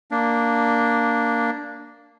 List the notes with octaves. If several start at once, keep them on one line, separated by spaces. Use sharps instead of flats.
A#3 D4